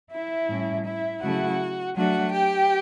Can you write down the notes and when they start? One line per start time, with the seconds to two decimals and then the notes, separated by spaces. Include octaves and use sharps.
0.11 E4 E5
0.48 A2 G3 C#4
0.84 E4 E5
1.21 C#3 F#3 A3 E4 F#4 F#5
1.95 F#3 A3 D4 F#4 F#5
2.32 G4 G5